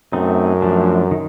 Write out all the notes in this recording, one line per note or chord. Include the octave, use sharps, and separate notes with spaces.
F#2 A3 C4 D#4
F3 A3 D4
D#3